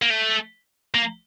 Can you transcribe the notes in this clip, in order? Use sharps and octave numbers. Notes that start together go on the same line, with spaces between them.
A#3
A3
A#3